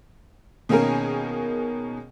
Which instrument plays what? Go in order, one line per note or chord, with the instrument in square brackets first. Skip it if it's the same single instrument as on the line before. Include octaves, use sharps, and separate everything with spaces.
[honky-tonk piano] B2 D#3 A#3 C#4 G#4 A#4